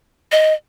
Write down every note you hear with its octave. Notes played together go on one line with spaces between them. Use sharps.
D#5